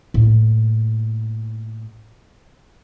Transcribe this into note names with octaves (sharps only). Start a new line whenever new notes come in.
A2 A#3